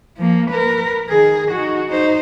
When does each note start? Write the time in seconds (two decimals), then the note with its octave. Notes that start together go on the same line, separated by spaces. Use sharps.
0.17 F3 A#3
0.50 A#4 B4
1.08 D#3 G#4
1.51 D#4 F#4
1.87 D#4 C5